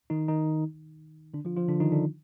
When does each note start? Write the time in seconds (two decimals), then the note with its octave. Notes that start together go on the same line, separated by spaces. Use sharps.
0.10 D#3 D#4
0.28 D#3 D#4
1.34 D3 D4
1.45 F3 F4
1.57 F3 F4
1.69 D3 D4
1.80 D#3 D#4
1.92 D3 D4